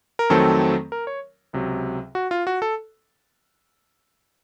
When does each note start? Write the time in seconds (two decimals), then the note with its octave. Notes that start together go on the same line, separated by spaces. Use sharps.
0.19 A#4
0.30 F2 D#3 F#3 A3 C4 A4
0.92 A#4
1.07 C#5
1.53 C#2 C3 F#3
2.15 F#4
2.31 F4
2.47 F#4
2.62 A4